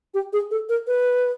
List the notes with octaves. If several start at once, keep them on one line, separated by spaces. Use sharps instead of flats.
G4
G#4
A4
A#4
B4